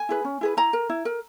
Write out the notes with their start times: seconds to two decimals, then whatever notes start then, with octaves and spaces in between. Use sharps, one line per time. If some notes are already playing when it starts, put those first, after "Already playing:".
Already playing: G#5
0.09 E4 G#4 B4
0.25 C#4
0.41 E4 G#4 B4
0.57 E4 A#5
0.73 A#4
0.89 E4
1.05 A#4